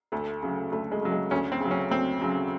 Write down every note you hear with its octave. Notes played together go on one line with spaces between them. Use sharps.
D2 A3
C#3 F#3
D2 A3
G#3
C#3 F#3
G#3
D2 C#4
C4
C#3 F#3
C#4
D2 C4
C#3 F#3